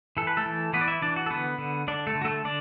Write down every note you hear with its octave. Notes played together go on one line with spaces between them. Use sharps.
E3 A4
B4
A3 A4
E3
E3 B3 B4
D5
E4 E5
E3 D4 D5
F#4
A4
D3 B3 B4
D3
D3 D4 D5
A3 A4
D3
F#4
A3 A4
D3 D4 D5